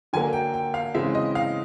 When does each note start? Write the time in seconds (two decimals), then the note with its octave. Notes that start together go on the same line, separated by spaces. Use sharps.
0.13 D3 F#3 A#3 G#5
0.33 G5
0.54 G5
0.74 F5
0.94 C#3 E3 G#3 C4 E4 E5
1.15 D#5
1.35 F5